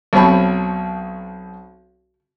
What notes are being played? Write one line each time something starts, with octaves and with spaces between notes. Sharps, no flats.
B1 B2 C4 C#5 A5 B5